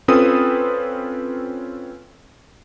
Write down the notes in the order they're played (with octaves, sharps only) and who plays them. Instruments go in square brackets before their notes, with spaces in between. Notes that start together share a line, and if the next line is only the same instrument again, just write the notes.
[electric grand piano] C4 C#4 F4 A4 B4 D#6